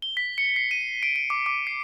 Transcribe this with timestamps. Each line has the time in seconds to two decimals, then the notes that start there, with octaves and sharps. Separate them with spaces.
0.02 G7
0.17 B6
0.38 C#7
0.56 C7
0.71 D#7
1.03 D7
1.16 D7
1.30 D6
1.46 D6
1.67 C7